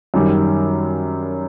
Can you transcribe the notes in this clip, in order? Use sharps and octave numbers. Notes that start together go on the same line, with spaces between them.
F#2 D#3 G3